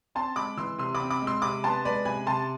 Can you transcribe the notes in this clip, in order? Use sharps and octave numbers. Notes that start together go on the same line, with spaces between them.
C4 A5 C6
G#3 B5 D6
E3 C6 E6
C3 C6 E6
B5 D6
C4
B5 D6
G#3
C6 E6
C3 B5 D6
B3 A5 C6
G#3 B4 D5
C3 G#5 B5
C3 A5 C6